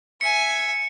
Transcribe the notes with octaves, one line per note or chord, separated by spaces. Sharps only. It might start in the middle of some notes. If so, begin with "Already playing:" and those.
E5 G#5 C#7